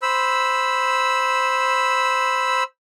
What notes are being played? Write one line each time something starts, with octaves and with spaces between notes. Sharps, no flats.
C5 B5 E6